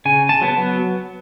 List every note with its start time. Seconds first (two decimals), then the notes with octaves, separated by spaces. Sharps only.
0.05 C#3 G#5
0.29 A5
0.41 F#3 B3